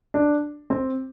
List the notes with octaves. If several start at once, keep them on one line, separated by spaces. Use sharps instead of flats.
D4
C4